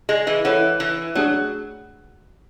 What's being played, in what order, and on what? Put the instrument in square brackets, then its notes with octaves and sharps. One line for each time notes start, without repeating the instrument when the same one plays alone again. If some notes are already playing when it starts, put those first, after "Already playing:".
[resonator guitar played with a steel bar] G#3
E3
[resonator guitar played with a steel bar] E3 [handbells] E4 A4 C#5 F#5
[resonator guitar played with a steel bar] E3
[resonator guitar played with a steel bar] F#3 [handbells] A3 D4 G#4